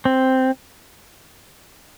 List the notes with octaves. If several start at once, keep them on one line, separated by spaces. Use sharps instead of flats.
C4